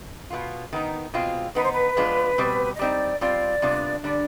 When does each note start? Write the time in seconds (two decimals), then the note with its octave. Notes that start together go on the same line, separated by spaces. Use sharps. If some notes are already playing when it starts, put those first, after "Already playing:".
0.30 B2 B3 F4
0.73 D#3 B3 D#4
1.14 B2 G#3 C4 F4
1.55 D#3 B3 D#4 B4
1.63 C5
1.72 B4
1.97 F3 G#3 B3 D4 F4
2.38 B2 G3 C4
2.76 D#5
2.79 G3 C4 D#4 D5
3.21 G3 C4 F4 D5
3.62 C3 G3 B3 D4 F4
4.03 D3 G3 D4 D5